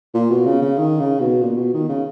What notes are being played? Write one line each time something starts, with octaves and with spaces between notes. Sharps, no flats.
A#2
B2
C#3
C#3
D#3
C#3
B2
A#2
B2
D#3
C#3